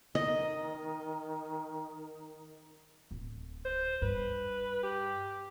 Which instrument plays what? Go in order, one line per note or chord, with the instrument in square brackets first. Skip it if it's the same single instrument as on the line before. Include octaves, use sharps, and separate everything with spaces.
[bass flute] D#3 [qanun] D#5
[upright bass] D1
[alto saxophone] C5
[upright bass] G2 [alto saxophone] B4
[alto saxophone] G4